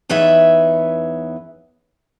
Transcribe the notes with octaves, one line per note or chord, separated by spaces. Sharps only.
E2 D#4 B4 C#5 E5